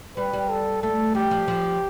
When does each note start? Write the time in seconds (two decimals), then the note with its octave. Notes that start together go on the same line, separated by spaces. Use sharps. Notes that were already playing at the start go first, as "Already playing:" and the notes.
0.17 G3 B4
0.33 G3
0.49 A4
0.82 A3 A4
1.15 G3 G4
1.31 F3
1.48 F3